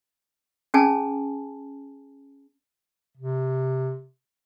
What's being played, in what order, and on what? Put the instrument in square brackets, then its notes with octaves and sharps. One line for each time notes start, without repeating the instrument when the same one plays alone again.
[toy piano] C#4 G#4 G#5 A5
[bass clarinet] C3